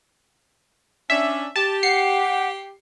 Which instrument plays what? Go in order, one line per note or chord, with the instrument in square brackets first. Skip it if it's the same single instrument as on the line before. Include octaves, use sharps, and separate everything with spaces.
[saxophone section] C#4 D4 [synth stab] E5
[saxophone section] G4 [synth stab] A5
[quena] F#5 [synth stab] C7 C#7